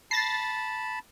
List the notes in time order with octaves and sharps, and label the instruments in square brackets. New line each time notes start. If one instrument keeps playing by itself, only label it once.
[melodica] A5 B5 [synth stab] A6 A#6 C7